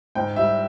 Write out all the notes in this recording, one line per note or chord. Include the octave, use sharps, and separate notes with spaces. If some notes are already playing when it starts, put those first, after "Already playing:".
G#2 G5
G3 E5